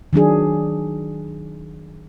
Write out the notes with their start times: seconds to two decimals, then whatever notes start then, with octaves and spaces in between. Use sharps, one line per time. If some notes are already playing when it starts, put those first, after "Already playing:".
0.13 D#3 F#3 D4 G#4